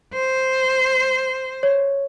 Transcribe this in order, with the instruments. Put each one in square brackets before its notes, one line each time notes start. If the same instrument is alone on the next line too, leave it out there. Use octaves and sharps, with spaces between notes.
[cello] C5
[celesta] C#5